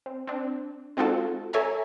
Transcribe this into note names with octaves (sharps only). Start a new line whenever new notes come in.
C4
C4 D4
G#3 C4 D#4 F4 F#4 A4
A4 C#5 E5 G#5 A#5